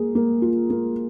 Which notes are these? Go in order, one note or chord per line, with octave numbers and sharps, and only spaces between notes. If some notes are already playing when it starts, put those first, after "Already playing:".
Already playing: A#3 G#4
A#3
F4
A#3